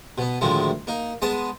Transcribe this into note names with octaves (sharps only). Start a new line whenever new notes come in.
B2 B3
D2 A2 D#3 F3 G#3
A#3 D#4
G#3 B3 A5 D#6